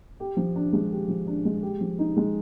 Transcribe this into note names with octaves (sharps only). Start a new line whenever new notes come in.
G4
F3
D4
G#3
G4
F3
D4
G#3
G4
F3
D#4
G#3